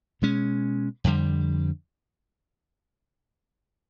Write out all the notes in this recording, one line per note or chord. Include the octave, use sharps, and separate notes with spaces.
B2 G#3 C#4
F2 D3 G3